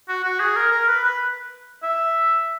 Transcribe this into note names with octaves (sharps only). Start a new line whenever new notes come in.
F#4
F#4
G#4
A#4
A#4
B4
B4
E5